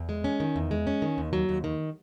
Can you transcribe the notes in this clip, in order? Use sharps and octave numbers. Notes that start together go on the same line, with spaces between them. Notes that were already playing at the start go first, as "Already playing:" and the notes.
Already playing: E2
G#3
C#4
D#3
E2
G#3
C#4
D#3
D#2
F#3
D#2
D#3